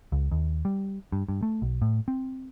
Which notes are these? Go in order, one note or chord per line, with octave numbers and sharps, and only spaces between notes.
C#2
D#2
G3
G2
G2
A3
B1
A2
C4